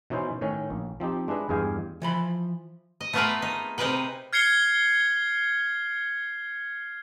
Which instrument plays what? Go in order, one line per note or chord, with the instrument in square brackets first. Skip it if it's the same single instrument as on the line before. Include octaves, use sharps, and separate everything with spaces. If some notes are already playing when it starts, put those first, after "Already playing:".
[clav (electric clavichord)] B2 E3 C#4 D#4 E4 C5
A2 D#3 C#4
A#1
F3 C4 D#4 G4
G#3 D4 E4 B4 D#5
E2 G2 G#3 G#4 F5 G5
[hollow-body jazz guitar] E3 F3 B5
[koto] D#5
A3 B3 F4 G#4 A#4 B4
D#4
C3 D#4 G#4 A#4 B4 G5
[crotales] F6 G#6 C7 C#7 G7